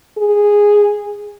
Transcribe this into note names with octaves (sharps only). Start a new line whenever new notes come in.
G#4